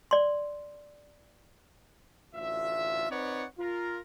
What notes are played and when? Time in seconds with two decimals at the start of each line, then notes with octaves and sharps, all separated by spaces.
0.11 D5 C6
2.35 A1 D2 F4 E5
3.10 C4 D#4 B4 C#5 D5 F#5
3.59 F4 A#4